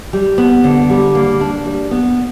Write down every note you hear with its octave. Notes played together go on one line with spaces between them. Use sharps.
G3
B3
D3
G3
A#3
D4
G3
B3